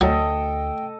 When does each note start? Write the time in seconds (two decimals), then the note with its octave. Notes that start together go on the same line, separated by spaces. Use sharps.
0.01 D2 F#3 A4 D#5 G5